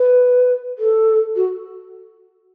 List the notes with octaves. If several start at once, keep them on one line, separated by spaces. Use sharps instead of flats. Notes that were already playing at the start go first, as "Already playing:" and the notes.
Already playing: B4
A4
F#4